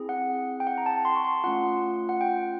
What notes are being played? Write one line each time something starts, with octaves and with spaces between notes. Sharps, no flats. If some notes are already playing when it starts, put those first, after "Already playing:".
Already playing: C4 E4 G#4
F#5
G5
F#5
A#5
A5
C6
C#6
C6
A3 C#4 F4 F#5
F#5
G5